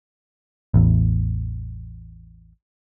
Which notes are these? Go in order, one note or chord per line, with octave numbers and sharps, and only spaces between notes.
A1 E2